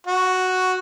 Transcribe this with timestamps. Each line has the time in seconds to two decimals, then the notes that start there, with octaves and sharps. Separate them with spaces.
0.07 F#4